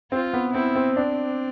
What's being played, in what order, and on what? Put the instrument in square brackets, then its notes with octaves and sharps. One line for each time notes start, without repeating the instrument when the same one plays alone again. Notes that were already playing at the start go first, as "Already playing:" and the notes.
[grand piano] C4 [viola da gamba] F4
[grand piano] B3
[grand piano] C4 [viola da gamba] E4
[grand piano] C4
[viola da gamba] C4 [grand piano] D4